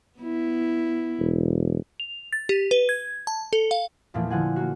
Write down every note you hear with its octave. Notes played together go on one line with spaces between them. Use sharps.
B3 E4
E1
F7
A6
G4
B4
G#6
A5
A4
F5
E2 A#2 F3 A3
D3 F3 F#5 G#5
A#3 F#4